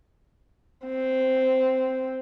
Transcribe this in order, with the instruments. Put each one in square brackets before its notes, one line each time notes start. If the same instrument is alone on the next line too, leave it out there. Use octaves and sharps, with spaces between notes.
[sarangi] C4